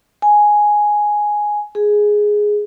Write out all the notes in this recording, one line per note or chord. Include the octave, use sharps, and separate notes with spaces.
G#5
G#4